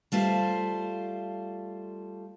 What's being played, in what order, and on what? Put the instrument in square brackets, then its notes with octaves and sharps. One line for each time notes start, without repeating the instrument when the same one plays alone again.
[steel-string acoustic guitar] G3 A3 F4 C5